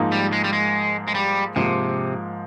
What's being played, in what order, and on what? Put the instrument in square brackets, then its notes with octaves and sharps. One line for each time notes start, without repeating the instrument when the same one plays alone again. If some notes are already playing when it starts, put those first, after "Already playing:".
Already playing: [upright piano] G#2 F3 A#3 D#4
[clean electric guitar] G3
G#3
G3
G#3
G#3
G3
[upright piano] G#2 F3 A#3 [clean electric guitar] C3